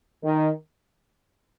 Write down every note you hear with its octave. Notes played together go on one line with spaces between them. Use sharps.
D#3